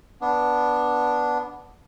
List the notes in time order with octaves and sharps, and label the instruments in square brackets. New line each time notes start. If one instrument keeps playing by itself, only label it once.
[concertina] B3 D4